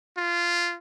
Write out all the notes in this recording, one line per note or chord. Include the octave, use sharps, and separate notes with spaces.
F4